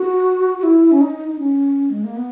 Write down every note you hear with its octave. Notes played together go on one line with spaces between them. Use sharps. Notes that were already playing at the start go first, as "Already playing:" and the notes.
Already playing: F#4
F#4
E4
C#4
D#4
D#4
C#4
G#3
A#3
B3